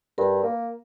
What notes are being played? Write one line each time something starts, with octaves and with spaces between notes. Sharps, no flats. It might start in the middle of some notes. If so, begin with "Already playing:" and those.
G2 A#4
A#3